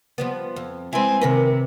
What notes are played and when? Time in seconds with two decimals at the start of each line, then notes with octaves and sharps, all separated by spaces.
0.18 F3 G3 B3
0.56 F2
0.93 G#3 C4 E4 B4 G#5
1.21 C3 D#3 A#4 B4